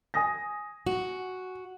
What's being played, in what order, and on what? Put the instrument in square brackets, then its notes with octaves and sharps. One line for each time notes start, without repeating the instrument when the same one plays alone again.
[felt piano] G#5 D#6 A#6
[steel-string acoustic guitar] F#4